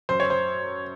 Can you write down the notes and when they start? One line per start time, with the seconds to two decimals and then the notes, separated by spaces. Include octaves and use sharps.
0.09 F#2 C5
0.20 C#5
0.30 C5